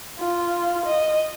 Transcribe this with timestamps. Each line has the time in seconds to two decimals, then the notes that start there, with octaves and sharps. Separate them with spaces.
0.19 F4
0.86 D#5